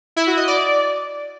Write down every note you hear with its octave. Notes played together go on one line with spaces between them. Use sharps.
E4
F#4
D#5
D5